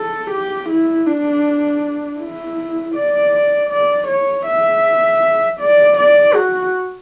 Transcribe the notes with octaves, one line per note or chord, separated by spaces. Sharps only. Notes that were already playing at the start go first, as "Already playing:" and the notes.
Already playing: A4
G4
E4
D4
E4
D5
D5
C#5
E5
D5
D5
F#4